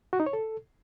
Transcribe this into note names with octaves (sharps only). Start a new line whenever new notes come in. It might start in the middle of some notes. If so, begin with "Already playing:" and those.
F#4
D#4
C#5
A4